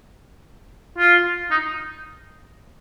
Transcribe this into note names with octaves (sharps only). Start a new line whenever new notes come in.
F4
D#4